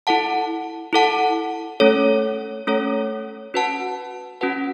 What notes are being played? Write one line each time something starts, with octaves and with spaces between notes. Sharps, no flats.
E4 A4 F#5 A5
E4 A4 F#5 A5
A3 C#4 A4 C#5
A3 C#4 A4 C#5
C#4 F#4 B4 F#5 A5
C#4 F#4 B4 F#5 A5